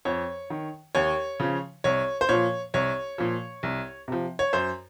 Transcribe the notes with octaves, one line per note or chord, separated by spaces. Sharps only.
F2 C#5
D#3
D#2 C#5
C#3 F3
C2 C#5
C5
A#2 F3 C#5
C2 C#5
A#2 F3
C2
C3 F3
C#5
F#2 C5